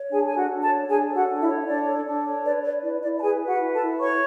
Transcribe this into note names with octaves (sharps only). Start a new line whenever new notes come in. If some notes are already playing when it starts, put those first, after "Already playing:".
Already playing: C#5
D4 G#4 G#5
A4 G#5
F#4 F#5
D4
A4 A5
C#5
D4 G#4 G#5
A4
F#4 F#5
D4
E4 E5
C#5
D4 D5
A4
D4
C#5
B4 D5
B4 D5
E4 D5
E4 D5
A5
G#4 B4 G#5
B4
F#4 F#5
E4
A4 A5
E4
B4 C#5 C#6